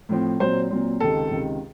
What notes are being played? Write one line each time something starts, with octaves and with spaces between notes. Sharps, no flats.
A2 F3 C4
A#2 F#3 C4 C5
A#2 F#3 C4
C#2 C3 D#3 A4
C#2 C3 D#3